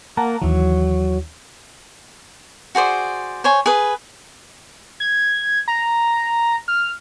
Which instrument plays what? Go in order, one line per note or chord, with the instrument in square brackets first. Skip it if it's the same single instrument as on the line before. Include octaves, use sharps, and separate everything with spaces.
[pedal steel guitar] A#3 [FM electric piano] F#5 A5 A#5
[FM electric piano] D#2 E3 [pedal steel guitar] F#3
[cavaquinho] F#4 G#4 C5 D5
C5 C#5 G#5
G#4 B4
[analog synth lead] G#6
A#5
F6